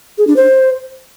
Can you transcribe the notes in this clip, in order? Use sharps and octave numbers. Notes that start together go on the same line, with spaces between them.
G#4
D4
C5